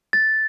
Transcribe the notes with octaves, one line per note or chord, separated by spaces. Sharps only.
A6